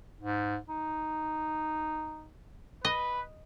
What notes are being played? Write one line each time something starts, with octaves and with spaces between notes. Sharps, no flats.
G#2
D#4
B4 D#5